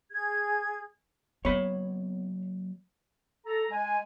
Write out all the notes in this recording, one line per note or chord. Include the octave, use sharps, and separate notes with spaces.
G#4 G#6
F#3 A#3 B3 C#4 C#5 B5
A4 A#5
G#3 G#5